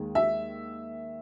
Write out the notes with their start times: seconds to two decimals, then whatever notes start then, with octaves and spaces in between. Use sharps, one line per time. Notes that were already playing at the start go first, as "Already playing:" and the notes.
Already playing: D#2 D#3 G#3
0.15 E5